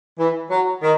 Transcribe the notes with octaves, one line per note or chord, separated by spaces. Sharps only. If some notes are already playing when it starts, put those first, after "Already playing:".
E3
F#3
D#3